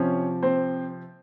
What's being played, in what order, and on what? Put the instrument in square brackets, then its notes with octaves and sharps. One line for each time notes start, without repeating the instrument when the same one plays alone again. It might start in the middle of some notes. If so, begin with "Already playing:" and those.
Already playing: [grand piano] C3 F3 C#4 C#5
C4 C5